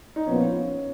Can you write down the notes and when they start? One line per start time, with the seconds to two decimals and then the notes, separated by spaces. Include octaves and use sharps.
0.16 D#4
0.26 A#1 A#2 F3 B3 C#4 F4